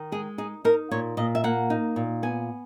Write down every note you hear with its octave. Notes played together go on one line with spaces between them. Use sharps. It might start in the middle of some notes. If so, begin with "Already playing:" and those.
Already playing: D#3
G#3 G#4
D#4 G#4
D#4 A#4
A#2 C#5
A#2 D#5
E5
A#3 F#5
D#4
A#2
B3 G#5